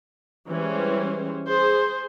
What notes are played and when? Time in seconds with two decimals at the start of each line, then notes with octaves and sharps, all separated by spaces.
0.48 E3 G3 G#3 C#4 C5
1.48 G#4 C5